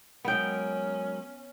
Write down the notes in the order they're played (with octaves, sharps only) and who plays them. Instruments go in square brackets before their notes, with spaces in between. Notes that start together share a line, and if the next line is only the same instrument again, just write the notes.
[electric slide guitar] F#3 G#3 A#4 [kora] B3 G5 [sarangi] C#4